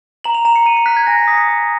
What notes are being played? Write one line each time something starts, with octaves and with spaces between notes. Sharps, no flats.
A#5 F#7
F7
A#5 F7
C#7
A#5 D#7
C#7
F#6 B6
G#6
G#5 A#6
B6
D#6 B6
C#7
D#6